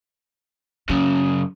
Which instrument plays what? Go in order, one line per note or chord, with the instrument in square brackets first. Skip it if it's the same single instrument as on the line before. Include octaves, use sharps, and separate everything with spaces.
[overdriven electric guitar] F#2 C#3 [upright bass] C#4